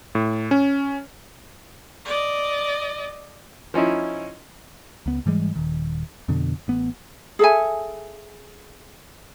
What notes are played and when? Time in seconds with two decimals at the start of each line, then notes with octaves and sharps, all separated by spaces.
0.15 A2
0.51 C#4
2.05 D5 D#5
3.74 F3 C#4 D#4 E4
5.06 C#2 B3
5.26 G#2 E3 G3 G#3
5.56 D#1 D#3
6.28 F2 B2 D3
6.68 A1 B3
7.39 G#4 A4 E5 G#5